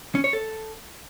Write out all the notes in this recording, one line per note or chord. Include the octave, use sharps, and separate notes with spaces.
C#4
C#5
A4